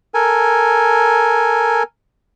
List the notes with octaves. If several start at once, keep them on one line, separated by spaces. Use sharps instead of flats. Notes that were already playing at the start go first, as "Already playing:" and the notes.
A4 A#4 G#5